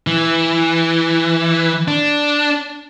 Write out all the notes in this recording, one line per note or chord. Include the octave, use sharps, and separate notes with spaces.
E3
D4